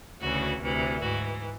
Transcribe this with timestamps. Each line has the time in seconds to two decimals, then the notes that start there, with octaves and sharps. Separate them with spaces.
0.21 D2 C#3 E3 F#4
0.62 D2 C3 E3
1.02 G#2 E3 F#4